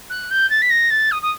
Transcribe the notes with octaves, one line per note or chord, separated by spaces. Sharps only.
F#6
G6
A6
B6
A#6
A6
D#6
D#6